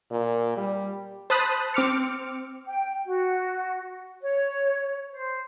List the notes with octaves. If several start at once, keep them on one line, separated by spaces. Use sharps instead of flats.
A#2
G3
C5 A5 B5 D#6 F#6
C4 D6 F6 C#7
G5
F#4
C#5
C5